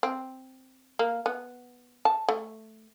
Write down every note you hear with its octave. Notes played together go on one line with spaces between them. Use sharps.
C4
A#3
B3
A5
A3